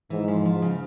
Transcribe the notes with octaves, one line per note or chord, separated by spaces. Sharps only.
G#2 E3
F3
F3
C#3